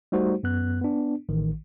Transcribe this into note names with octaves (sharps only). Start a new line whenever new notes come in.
G3 A3 D#4 F#4 C5
F#2 B3 F#6
B3 D4
A1 D#3